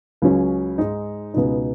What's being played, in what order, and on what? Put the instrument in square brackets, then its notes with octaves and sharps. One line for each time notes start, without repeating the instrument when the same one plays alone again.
[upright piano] C#2 C#3 F#3 C#4
G#2 G#3 D#4
C#2 B2 B3 D#4